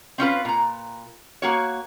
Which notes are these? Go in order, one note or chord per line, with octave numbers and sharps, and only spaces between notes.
C4 C#4 F4 B4
A#2 A#5
A#3 F#4 C#5